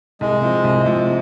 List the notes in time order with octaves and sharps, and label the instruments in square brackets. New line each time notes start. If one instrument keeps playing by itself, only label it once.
[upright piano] C2 [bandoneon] G#3
[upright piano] C3 F3
C2
C3 F3